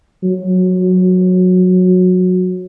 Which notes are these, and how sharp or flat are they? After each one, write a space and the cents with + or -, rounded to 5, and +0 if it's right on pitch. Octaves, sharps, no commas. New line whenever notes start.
F#3 -15